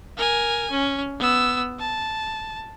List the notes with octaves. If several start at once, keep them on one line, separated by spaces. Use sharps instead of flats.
A#4 G#5
C#4
B3 E6
A5